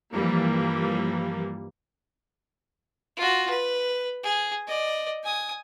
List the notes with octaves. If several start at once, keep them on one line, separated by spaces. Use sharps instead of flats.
G2 E3 F3 G3 A#3
F4 F#4
B4
G#4
D5 D#5
G#5 D#6